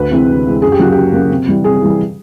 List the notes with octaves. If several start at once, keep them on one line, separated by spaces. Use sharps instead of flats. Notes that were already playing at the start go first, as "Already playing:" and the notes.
Already playing: D2 B4
C3 E3 G#3 C4
D2
C3 E3 G#3 C4
F#2 G#4
G4
C#3 F#3 A#3 F#4
F#2 G4
C#3 F#3 A#3
C3
E3 G3
C3 G#4
E3 G3